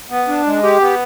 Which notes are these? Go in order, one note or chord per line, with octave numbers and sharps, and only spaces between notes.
B3
D4
G#3
G4
B3